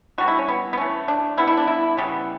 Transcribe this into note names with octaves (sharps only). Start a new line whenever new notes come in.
D3 G3 B3 F#4
E4
C#4
B3
B3
E3 A3 C#4
D4
D3 G3 B3 E4
E4
D4
E4
C#3 E3 G3 B3